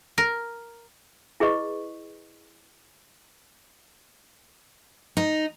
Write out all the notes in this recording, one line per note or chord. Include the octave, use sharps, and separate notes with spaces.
A#4
E4 G#4 B4 D#5 C#6
D#4